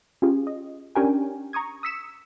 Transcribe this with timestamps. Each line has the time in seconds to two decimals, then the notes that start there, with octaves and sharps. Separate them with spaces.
0.22 C#4 F4 G4 G#4
0.47 D#5
0.95 C#4 D4 G4 A#4 G5 G#5
1.53 A#5 C#6 D#6 G#6
1.83 D#6 E6 B6 C#7 E7